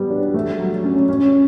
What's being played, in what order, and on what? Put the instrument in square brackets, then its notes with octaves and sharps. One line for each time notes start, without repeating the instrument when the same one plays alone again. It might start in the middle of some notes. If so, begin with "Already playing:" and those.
Already playing: [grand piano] G3 B3
D4
A3
F#3
C#4
C#4